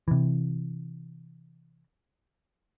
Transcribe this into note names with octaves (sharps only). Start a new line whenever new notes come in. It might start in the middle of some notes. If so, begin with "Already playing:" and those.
C3 E3